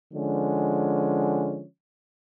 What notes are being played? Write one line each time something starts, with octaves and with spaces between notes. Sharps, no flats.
D3 F3 G#3 C#4